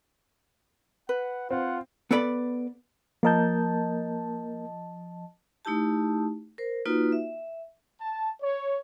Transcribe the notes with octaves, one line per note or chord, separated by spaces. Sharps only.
B4 F#5
C4 F4 F#5
B3 A4 B4 D5 A#5 B5
F3 A#3 A#4 D#5 A5 G6
A3 D#4 E4 G4 A5
A#4 C5
A#3 D#4 F4 F#4 B4
E5
A5
C#5